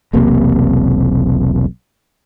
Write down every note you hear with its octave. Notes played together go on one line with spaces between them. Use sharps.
E1 B1 C3 A#3